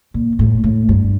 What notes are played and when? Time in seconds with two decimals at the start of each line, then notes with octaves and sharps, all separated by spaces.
0.14 A#2
0.39 A2
0.64 A2
0.89 G2